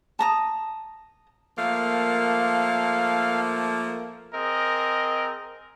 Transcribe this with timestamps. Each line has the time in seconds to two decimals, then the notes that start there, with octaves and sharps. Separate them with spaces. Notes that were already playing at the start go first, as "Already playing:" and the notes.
0.19 A5 A#5 D#6
1.58 F3 A3 A#3 F5
4.34 C4 G#4 A#4 D#5